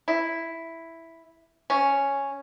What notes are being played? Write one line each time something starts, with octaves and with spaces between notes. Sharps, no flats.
E4
C#4